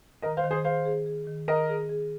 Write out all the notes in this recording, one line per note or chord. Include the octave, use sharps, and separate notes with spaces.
D#3 A#4 D#5
C5 F5
D#3
G#4 C5
G#4 C5 F5
G#4
G#4
D#3
D#3 A#4 D#5
G#4
G#4